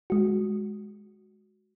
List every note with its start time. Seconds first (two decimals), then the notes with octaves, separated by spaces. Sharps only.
0.10 G#3 F#4